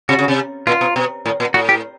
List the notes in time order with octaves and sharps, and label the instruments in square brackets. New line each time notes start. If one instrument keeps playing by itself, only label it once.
[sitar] C3 [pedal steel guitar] F#4
[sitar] C#3
C3
[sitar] A#2 [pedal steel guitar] F4
[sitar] B2
B2
A2
A#2
[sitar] A2 [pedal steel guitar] F#4
[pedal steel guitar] G4